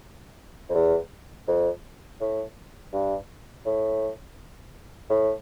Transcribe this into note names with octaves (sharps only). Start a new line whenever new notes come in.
F2
E2
F2
A2
G2
A2
A2